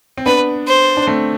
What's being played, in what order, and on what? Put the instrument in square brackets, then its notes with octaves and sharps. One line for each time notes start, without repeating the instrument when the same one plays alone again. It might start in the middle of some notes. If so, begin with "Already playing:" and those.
[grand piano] C4
[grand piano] B3 D4 [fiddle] B4
[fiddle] C5
[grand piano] D4
A3 C4